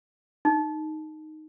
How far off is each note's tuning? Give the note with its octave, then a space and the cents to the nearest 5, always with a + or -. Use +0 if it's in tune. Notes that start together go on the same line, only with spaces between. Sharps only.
D#4 -5